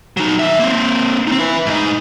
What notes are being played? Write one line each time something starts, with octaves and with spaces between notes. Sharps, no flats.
F#3 D#4
D#3 E5
A#3 C4
C4 D#4
E4 B4
G#2 D#4